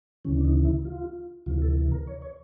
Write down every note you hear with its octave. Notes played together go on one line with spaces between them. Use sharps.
D2 C#3 E3 C#4
D4
D#4
E4
F4
D2 C3 E3 F4
A4
A#4
C#5
C#5